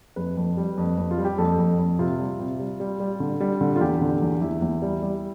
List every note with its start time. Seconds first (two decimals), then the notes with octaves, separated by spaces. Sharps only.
0.16 F2 B4
0.37 F2
0.57 G3
0.77 F2
0.98 F2
1.11 F4
1.18 G3
1.25 G4
1.38 F2 A4
1.58 F2
1.79 F2
1.99 C3 F4
2.19 G3
2.39 C3
2.60 G3
2.80 G3
3.00 G3
3.20 D3
3.40 G3
3.61 D3
3.76 F4
3.81 E2 G4
4.01 D3
4.22 E2
4.41 E2 E4
4.62 E2
4.82 G3
5.03 G3